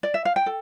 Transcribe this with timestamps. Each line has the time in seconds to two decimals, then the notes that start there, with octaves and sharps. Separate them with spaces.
0.03 D5
0.14 E5
0.25 F5
0.36 G5
0.46 A4